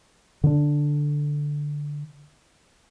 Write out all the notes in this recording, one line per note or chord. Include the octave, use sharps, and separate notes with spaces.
D3 D4